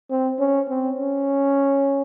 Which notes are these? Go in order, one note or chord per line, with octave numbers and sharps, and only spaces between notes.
C4
C#4
C4
C#4